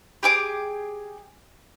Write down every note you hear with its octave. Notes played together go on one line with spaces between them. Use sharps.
G4 G#4 D6